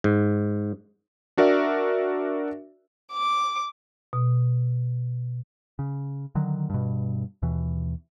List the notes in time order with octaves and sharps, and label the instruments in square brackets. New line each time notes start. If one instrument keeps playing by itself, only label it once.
[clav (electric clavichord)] G#2
[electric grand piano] D4 F#4 A#4 D5 E5
[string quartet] D6
[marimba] B2
[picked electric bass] C#3
D3 D#3 F#3
G2 B2
D#2 B2 E3